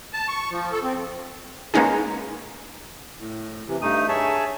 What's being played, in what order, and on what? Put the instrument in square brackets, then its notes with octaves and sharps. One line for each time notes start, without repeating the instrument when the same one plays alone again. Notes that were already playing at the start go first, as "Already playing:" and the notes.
[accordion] A5
C#6
F3
A4
C4
[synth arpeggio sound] G#3 A#3 B3 C#4 D#4 G#4
[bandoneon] A2
C3 E3
G2 A3 D#4 D#6
G#4 C#5 E5 A5